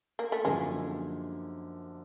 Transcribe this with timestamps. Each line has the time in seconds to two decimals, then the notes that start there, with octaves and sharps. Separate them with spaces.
0.19 A#3
0.32 A3
0.44 F#2 D3 F3 G#3 A#3 D#4